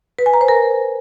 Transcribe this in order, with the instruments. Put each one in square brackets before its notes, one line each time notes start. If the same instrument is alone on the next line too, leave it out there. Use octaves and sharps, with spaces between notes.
[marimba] B4
G#5
A#5
C5
A#4